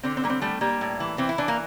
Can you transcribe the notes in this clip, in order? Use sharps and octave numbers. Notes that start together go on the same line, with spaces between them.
D3 C4
C4
G3 A#3
C4
G3 A3
G3 A#3
A2
E3
E3 C4
E4
E3 D4
A#3